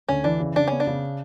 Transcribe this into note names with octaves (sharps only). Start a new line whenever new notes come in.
D2 C#4
E3 D4
C#3
C#3 D4
B3 C#4
D4
C#3